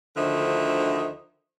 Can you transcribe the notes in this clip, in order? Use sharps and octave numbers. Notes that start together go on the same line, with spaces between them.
D2 D3 D#3 F3 C5 E5